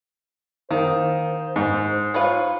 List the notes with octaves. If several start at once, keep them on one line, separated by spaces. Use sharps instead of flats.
D#3 A#3 C5
G#2
F4 B4 C#5